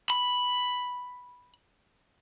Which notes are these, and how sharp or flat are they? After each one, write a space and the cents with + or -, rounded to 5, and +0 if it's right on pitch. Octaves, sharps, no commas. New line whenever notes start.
B5 +0